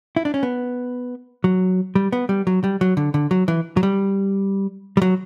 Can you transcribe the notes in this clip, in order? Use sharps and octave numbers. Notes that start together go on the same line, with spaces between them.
E4
D4
C#4
B3
F#3
G3
B3
G3
F#3
G3
F#3
D3
D3
F#3
E3
F#3
G3
G3
F#3